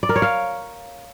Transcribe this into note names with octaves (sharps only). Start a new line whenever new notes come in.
D5
A#4
C#5
F5